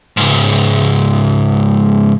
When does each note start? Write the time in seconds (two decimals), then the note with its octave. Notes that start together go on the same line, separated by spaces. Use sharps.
0.17 C#2 G#2